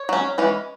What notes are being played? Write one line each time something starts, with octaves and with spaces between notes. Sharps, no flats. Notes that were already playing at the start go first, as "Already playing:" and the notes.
Already playing: C#5
F#3 C#4
E3 G#3 C#4